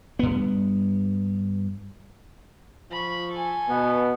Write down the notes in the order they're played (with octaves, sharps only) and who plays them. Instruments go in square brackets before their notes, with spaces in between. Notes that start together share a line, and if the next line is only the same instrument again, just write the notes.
[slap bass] G2 B3
[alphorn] F3 [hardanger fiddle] B5 C#6
[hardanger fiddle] A4 G#5
[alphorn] B2 [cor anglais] B3